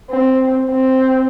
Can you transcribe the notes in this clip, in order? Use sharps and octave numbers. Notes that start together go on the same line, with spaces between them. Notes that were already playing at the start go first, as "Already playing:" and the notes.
C4
C4